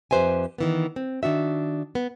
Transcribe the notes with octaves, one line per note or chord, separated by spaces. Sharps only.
F2 G4 B4 C5 E5 G#5
D#3 E3 B3
C4
D#3 D4 F#4 E5
B3